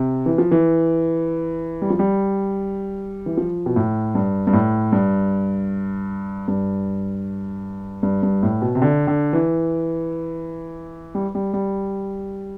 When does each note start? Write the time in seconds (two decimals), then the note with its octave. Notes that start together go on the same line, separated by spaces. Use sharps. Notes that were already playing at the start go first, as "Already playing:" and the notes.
Already playing: C3
0.26 E3
0.38 F3
0.51 E3
1.82 G3
1.90 F3
1.99 G3
3.26 E3
3.37 F3
3.66 B2
3.76 A2
4.15 G2
4.47 G2
4.53 A2
4.92 G2
6.48 G2
8.03 G2
8.23 G2
8.43 A2
8.62 B2
8.75 C3
8.82 D3
9.07 D3
9.33 E3
11.15 G3
11.35 G3
11.53 G3